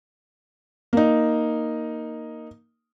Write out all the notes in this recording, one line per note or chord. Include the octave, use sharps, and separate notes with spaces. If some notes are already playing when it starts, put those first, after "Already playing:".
A#3 D#4